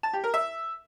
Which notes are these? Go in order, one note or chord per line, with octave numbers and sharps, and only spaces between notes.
A5
G4
A#4
E5